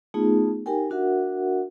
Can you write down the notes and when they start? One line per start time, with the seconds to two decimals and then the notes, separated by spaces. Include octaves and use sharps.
0.14 A3 B3 D#4 F4 G#4
0.66 D#4 G4 A#4 G5 G#5
0.90 D4 F#4 A#4 E5 F#5